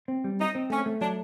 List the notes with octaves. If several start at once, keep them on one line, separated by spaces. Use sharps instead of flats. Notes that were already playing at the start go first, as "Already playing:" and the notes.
C4
G3
C4 D#4
C4
A3 C#4
A3
F#3 D4